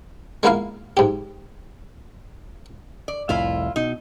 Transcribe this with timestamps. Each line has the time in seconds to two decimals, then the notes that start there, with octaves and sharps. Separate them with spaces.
0.43 G#3 A#3 B3 E4 F4 F5
0.97 G#2 G4
3.08 D5
3.29 C2 F2 A2 E4 F4 F5
3.76 B2 D#4